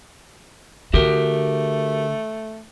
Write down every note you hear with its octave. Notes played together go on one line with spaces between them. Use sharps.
D3 A3 F#4 G4 A#4